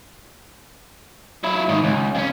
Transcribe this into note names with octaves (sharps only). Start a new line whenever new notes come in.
F#3 E4
G#2 D#3
C#2
F2 C#4